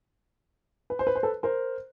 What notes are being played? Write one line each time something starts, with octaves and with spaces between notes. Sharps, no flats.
B4
C5
B4
C5
A4 B4
A#4 C5